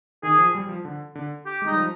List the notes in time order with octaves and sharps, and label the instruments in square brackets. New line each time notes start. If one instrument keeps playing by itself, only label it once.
[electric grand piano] D#3 [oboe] G#4
[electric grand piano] F3
G3
F3
D3
D3
[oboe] G4
[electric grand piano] G#3
[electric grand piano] G3 [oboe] D#4
[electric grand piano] F3